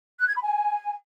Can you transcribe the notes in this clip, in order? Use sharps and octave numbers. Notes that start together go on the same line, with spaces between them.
F#6
G#6
B5
G#5